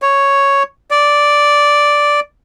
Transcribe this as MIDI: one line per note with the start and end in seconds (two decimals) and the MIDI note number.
0.02 0.63 73
0.91 2.20 74